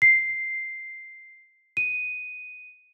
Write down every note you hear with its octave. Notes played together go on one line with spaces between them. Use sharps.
C7
D#7